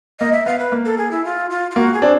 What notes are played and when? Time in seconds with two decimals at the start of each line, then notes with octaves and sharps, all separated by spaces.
0.20 A#3 D#5
0.33 E5
0.46 B3 F5
0.59 B4
0.72 A#3
0.85 A4
0.98 G#4
1.11 E4
1.25 F4
1.50 F4
1.71 F4
1.76 A#3 F#4
1.94 G#4
2.02 C4 D4